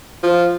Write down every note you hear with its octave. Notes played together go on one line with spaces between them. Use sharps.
F3